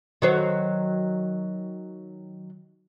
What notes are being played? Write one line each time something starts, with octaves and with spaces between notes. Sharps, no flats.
D#3 F#3 C5